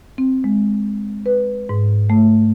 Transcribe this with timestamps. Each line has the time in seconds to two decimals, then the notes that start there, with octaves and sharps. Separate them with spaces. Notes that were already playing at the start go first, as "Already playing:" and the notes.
0.18 C4
0.44 G#3
1.26 B4
1.69 G#2
2.10 A3